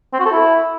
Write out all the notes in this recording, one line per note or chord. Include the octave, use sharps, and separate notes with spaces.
C4
F#4
A4
E4